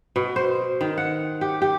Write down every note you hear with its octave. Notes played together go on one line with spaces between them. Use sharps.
B2
C5
D#3
F#5
G4
G4